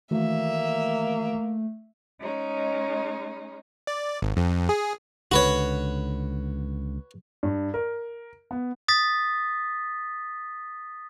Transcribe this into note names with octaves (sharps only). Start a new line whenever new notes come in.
D#3 E3 A3 A#3 F#4 E5
G#3 C#4 D#4
D5
G#1
F2
G#4
C#2 D3 F#4 B4 C#5
G2
A#4
B3
D#6 A6 B6